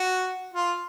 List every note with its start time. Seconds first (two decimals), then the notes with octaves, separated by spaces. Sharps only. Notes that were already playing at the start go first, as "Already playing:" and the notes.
Already playing: F#4
0.54 F4